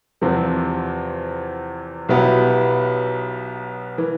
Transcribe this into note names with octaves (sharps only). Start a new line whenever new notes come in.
E2 C3 F3 C4
B1 B2 B3 E4 G4
E3